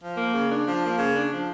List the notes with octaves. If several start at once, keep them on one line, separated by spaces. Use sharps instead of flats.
F3
A#3
C#3
D4
F3
A#3
C#3
D4
F3